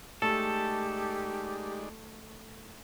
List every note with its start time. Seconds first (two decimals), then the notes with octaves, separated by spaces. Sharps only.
0.22 G#3 A3 D#4 G4 A4 D5